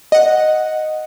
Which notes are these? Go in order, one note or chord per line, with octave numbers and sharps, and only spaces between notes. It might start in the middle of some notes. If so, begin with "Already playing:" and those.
D#5 F#5